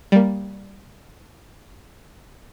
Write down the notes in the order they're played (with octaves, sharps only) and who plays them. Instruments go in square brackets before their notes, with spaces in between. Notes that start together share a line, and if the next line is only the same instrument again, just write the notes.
[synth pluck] G3 A#3